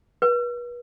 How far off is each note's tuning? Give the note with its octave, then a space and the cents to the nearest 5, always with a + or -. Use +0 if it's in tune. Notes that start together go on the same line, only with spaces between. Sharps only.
B4 -35